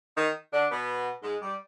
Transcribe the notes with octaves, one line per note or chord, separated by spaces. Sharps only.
D#3 D#4
D3 D4
B2 B3
G#2 G#3
G3